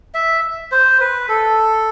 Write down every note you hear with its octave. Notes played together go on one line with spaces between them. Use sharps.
E5
C5
B4
A4